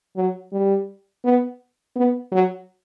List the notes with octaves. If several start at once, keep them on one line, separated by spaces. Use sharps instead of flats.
F#3
G3
B3
B3
F#3